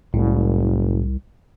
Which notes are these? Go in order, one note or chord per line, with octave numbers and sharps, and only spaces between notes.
F#1 C2 A2